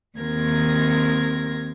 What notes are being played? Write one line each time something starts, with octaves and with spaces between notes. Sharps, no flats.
D#2 D#3 C4 A#4 G#6 A#6